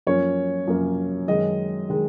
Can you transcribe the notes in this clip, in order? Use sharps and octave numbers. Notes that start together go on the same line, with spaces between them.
F#2 F3 A#3 C#4 C#5
F#2 F3 A#3 C#4
F#2 D#3 G#3 D#5
D#3 G#3